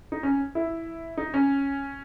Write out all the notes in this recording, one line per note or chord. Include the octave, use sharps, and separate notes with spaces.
D#4
C#4
E4
D#4
C#4